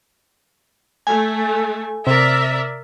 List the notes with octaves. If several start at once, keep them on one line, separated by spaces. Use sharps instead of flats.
A3 G#5
C3 A#4 D5 E5